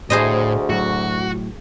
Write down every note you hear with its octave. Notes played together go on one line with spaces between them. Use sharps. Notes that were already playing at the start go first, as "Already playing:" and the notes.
D2 A2 G#4 C5 D#5
A2 F#3 F#4